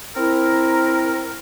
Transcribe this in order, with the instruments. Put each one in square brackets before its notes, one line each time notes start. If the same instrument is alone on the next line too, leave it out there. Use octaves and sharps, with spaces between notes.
[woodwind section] C4 E4 A#4